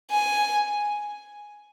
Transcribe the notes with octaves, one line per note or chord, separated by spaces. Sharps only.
G#5